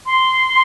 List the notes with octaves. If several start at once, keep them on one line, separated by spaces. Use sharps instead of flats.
C6